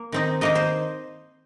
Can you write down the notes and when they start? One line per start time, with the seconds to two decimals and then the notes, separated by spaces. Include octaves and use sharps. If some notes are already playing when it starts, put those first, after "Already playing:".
Already playing: A#3
0.12 D#3 C4 D#4
0.41 D#3 A#3 D#4 D#5
0.55 C5